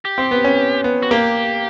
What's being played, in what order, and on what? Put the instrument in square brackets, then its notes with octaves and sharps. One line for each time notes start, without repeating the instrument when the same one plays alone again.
[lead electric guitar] G4
[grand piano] C4
B3
C#4
B3
[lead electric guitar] F#4
[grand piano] A#3 [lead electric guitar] G4